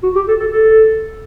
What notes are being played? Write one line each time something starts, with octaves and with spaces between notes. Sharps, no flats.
F#4
G4
A4
A4
A4